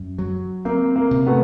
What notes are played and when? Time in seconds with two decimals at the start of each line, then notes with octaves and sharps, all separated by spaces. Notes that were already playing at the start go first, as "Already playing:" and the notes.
Already playing: F#2
0.18 F#3
0.65 A#3 C4
0.96 A#3
1.11 C3
1.26 A3 B3